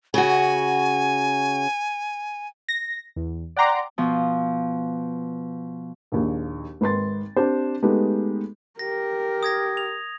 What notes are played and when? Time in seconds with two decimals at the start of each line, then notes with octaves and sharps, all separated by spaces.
0.14 C#3 F#4 G#5
2.69 A#6
3.16 E2
3.56 D5 F#5 G5 A#5 C6 D6
3.98 B2 F3
6.12 A#1 D#2
6.81 G#1 B4 C6 A6
7.36 C4 D4 G4 C5
7.83 G#3 A3 B3 D#4 G4 B4
8.79 G4 A#4 A#6
9.43 D#6 G#6 A#6
9.77 F7